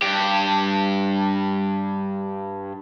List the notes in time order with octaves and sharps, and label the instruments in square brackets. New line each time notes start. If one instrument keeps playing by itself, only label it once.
[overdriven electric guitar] G2 G4